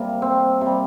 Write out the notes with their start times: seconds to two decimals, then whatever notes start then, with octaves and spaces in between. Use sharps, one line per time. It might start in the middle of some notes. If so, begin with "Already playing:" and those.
Already playing: C3 G3 A#3
0.22 C4
0.61 C3 G3